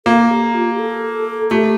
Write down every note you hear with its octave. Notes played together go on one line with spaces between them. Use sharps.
A#3 A4
G4
F4
G4
A4
A3 G4